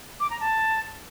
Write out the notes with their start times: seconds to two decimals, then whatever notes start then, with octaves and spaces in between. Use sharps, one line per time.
0.20 D6
0.30 A#5
0.40 A5